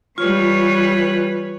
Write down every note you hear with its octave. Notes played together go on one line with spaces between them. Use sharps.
E3 G3 F4 B4 C#5